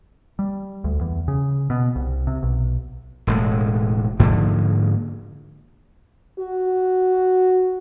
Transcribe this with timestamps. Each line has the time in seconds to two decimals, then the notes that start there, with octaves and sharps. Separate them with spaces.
0.39 G3
0.84 D2
1.01 E2
1.28 C#3
1.70 B2
1.96 C2
2.27 C3
2.43 B1
3.27 E1 A2 G#3
4.20 G#2 D3 F3 A#3
6.39 F#4